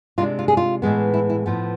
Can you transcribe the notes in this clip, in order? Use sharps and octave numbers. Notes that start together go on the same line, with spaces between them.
C3 G#3 D4 F4
F4
G#4
F4
A2 E3 G#3 B3
E4
E4
A2 F3 B3